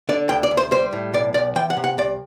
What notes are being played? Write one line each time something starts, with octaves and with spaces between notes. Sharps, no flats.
D3 D5
D2 G5
D5
D2
C5
G3 C5
A2
B1 D5
B1 D5
E3 G5
F#5
C3
F#5
C2 D5